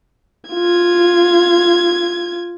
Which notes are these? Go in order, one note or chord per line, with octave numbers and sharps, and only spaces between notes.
F4 G#6